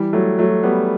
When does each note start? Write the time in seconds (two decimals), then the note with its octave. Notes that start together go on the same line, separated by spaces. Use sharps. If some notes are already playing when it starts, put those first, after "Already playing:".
Already playing: E3 G3
0.13 F#3 A3
0.39 F#3 A3
0.63 G3 B3